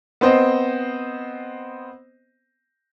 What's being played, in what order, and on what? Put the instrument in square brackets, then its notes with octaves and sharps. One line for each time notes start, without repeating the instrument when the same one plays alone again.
[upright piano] B3 C4 C5 D#5